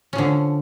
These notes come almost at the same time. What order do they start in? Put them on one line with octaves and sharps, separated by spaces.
C#4 F3 D3